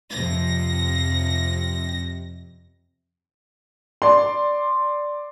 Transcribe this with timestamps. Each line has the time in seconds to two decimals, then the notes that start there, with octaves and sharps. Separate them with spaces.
0.10 F2 C3 A#6
4.02 D5 C6